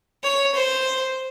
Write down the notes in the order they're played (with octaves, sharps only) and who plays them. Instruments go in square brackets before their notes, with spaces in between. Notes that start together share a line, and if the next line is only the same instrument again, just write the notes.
[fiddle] C#5
C5